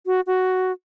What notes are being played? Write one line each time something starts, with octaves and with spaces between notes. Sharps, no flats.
F#4
F#4